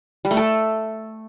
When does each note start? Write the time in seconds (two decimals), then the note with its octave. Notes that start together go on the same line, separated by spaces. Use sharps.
0.25 G3
0.31 A3
0.37 A4